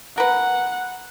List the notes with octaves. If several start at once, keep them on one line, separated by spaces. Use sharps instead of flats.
A#4 B4 F#5